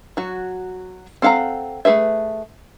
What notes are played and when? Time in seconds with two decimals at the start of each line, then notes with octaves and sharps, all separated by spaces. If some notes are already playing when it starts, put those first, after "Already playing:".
0.17 F#3 F#4
1.22 C4 A4 F5 F#5 A#5
1.85 A3 G#4 B4 E5